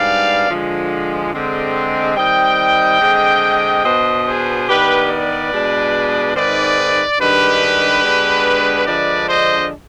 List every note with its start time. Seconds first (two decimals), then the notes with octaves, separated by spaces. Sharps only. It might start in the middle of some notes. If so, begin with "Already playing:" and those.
Already playing: G#2 G3 B3 D4 D5 F5
0.50 D3 F3 G#3
1.33 D3 G#3 C4
2.16 D#3 G3 C4 D#5 G5
3.01 D3 G#3 C4
3.84 B2 B3 D4 C5 D#5
4.26 G#4 C5
4.68 D#3 B3 D4 G4 B4
5.10 B4 D5
5.53 B2 G#3 D4
6.35 G#2 D#3 G#3 C4 B4 D5
7.19 G2 D#3 G#3 D4 G4 B4
8.03 D3 G#3 B3 D4
8.87 D3 F3 G#3 D4 B4 D5
9.29 C5 D#5